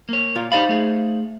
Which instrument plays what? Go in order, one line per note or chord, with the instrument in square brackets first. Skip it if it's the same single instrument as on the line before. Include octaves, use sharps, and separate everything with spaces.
[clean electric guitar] A#3 C#5
[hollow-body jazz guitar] A#2 F4
[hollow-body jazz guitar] D#4 C5 F5 [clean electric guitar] G4 D5 B5
[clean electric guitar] A3 G#4